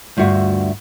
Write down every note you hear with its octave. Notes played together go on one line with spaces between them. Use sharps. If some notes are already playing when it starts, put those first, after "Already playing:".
D2 G2 F4 F#4 E5